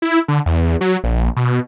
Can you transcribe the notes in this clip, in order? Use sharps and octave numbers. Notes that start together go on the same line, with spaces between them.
E4
D3
E2
F#3
A#1
B2